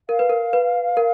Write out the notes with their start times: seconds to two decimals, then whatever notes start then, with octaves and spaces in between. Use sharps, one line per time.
0.09 A#4 F5
0.19 B4
0.30 A#4
0.53 B4
0.97 A#4